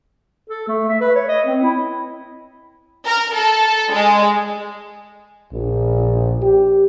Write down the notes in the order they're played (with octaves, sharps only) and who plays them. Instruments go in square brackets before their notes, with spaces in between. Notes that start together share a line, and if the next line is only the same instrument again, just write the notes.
[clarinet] A4
A3
E5
B4
C#5
D#5
C4
E4
[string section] A#4
A4
G#3
[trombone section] A#1
G4